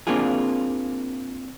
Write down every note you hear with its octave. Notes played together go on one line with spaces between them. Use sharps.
A#3 C4 D4 F4 G#4